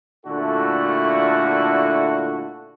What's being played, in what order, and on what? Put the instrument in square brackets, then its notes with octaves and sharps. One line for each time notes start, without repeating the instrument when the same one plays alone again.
[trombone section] A#2 D3 A3 E4 F#4 A4